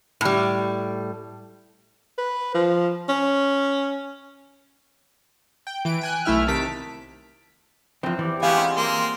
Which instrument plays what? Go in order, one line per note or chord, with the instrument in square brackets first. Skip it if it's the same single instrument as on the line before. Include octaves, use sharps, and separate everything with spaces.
[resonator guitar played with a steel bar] A2 G3
[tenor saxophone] B4
F3
C#4
[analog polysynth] G5
E3 D7
G5 G#5 F#6
B1 A3 E4 E5 F6
C3 D#3 A5 B6 D7
[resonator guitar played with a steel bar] E2 C4 [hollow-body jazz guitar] E3 F3
[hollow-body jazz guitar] E3 [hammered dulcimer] G4 D5
[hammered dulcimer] G#3 F#4 [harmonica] B3 G4 G#5 [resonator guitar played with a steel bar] F5
[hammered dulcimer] C4 D#4 F4
[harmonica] A#3 C6